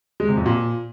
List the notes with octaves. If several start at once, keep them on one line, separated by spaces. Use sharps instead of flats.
G#3
C3
F2
A#2